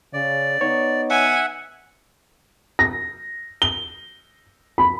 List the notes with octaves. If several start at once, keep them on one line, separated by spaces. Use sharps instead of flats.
C#3 D5
B3 D#4 C#5
E5 F#5 G#5
A#6
G7
B5